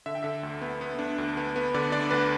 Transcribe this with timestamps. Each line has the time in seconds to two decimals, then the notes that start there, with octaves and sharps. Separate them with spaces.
0.06 D3 E5
0.15 G5
0.23 D3 E5
0.43 D2
0.61 B3
0.81 B3
0.99 D4
1.18 D2
1.37 B3
1.56 B3
1.74 D3 D5
1.92 D4 D5
2.11 D2 B4